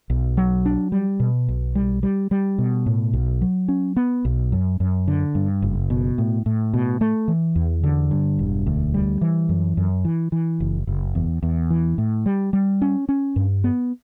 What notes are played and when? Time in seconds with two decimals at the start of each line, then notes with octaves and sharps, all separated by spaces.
0.10 B1
0.37 F#3
0.65 D4
0.92 G3
1.20 B2
1.48 B1
1.75 G3
2.03 G3
2.31 G3
2.58 B2
2.86 A2
3.13 B1
3.41 F#3
3.68 C#4
3.96 B3
4.25 B1
4.52 F#2
4.80 F#2
5.08 D3
5.35 G2
5.62 F#1
5.90 B2
6.18 A2
6.46 A2
6.74 B2
7.01 A3
7.28 E3
7.56 E2
7.84 D3
8.11 G2
8.39 E1
8.67 D2
8.94 G3
9.21 E3
9.49 F#2
9.77 F#2
10.05 E3
10.32 E3
10.60 F#1
10.87 F#1
11.15 E2
11.43 E2
11.70 E3
11.98 A2
12.26 G3
12.53 G3
12.82 C#4
13.09 C#4
13.36 G2
13.64 B3